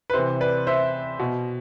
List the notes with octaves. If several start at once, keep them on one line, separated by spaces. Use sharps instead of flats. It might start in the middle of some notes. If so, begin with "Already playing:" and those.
B4
C3 E3 C5
B4 D5
C5 E5
B2